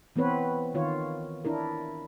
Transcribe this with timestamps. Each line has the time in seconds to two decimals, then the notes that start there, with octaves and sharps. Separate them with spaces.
0.16 E3 B3 C4 B4 C#5
0.74 D#3 F4 C#5
1.45 D4 E4 A#4